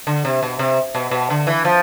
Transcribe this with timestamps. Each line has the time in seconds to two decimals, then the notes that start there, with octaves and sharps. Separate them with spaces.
0.07 D3
0.25 C3
0.43 B2
0.59 C3
0.95 B2
1.11 B2
1.30 D3
1.47 E3
1.65 F3